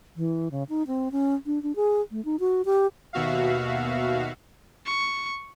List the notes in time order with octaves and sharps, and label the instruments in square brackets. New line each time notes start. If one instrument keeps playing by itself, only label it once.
[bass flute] E3
C#3
D#4
C4
C#4
D4
D4
G#4
A3
D#4
F#4
G4
[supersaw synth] D#2 B2 F#4 E5 F5
[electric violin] C#6